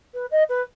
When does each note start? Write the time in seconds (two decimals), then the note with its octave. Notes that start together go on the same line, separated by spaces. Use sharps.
0.14 B4
0.31 D#5
0.49 B4